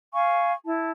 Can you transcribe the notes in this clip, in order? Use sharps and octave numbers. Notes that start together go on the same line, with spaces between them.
F5 G#5 C#6
E4 A5